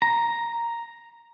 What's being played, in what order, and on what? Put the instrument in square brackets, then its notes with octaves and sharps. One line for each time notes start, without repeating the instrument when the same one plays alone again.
[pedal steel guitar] A#5